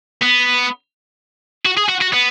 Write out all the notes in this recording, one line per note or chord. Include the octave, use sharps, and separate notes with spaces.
B3
F#4
G#4
F#4
F#4
B3